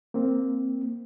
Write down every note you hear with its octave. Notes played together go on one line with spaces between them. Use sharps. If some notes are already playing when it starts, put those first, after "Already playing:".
A#3 C4